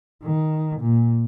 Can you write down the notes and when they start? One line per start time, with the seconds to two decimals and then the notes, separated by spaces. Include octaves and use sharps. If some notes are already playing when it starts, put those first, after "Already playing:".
0.23 D#3
0.80 A#2